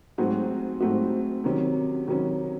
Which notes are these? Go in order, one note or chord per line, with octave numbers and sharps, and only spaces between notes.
G#2 F#3 A3 C4 F#4
G#2 F#3 A3 C4 F#4
C3 D#3 F#3 C#4
C3 D#3 F#3 C#4